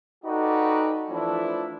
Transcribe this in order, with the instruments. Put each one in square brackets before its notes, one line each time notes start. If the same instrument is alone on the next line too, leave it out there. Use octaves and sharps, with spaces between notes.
[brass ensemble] D#4 F#4 G4 A4 B4 D5
E3 F3 A3 D4 E4